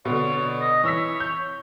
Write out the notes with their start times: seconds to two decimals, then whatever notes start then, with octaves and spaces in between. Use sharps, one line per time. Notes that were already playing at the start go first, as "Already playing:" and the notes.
0.05 B2 D3 C#5
0.61 D#5
0.84 E3 C#5 E6 B6
1.20 G6